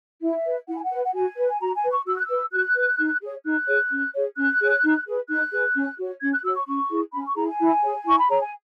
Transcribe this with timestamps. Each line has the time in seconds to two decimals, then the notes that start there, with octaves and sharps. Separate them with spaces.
0.22 E4 E5
0.46 B4
0.68 E4 F#5
0.76 G#5
0.83 F#5
0.91 B4
1.04 F#5
1.14 F#4 G#5
1.37 B4
1.48 G#5
1.61 F#4 A#5
1.75 G#5
1.84 B4
1.91 C#6
2.07 F#4 E6
2.17 F#6
2.26 B4 E6
2.52 F#4 F#6
2.76 B4
2.99 D#4
3.22 G#4 C#5
3.45 D#4 F#6
3.68 G#4 C#5
3.91 C#4
4.14 G#4 C#5
4.37 C#4 F#6
4.60 G#4 C#5
4.83 D#4
5.07 G#4 B4
5.29 D#4 F#6
5.52 G#4 B4
5.75 C#4
5.98 F#4 C#5
6.21 C#4 G#6
6.33 F#6
6.44 F#4 E6
6.48 C#5
6.55 C#6
6.67 C#4 C#6
6.90 E4 G#4
7.13 C#4 B5
7.25 C#6
7.36 E4 G#4 A#5
7.47 G#5
7.59 E4
7.83 G#4 C#5
8.05 E4 C#6
8.18 B5
8.29 G#4 C#5 A#5
8.41 G#5